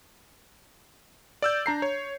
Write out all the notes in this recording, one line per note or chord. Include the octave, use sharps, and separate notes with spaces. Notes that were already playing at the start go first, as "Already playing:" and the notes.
D5 E6 G6
D4 A#5 C7
C#5